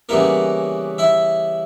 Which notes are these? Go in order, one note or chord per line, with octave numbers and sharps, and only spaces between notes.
C#3 E3 G3 A#3 B3 E4 A#4
E4 E5